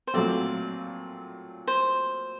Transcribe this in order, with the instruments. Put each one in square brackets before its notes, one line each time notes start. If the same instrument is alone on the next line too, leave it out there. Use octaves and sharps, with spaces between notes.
[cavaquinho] C5
[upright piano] A#2 F#3 A3 C4 [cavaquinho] D5
[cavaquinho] C5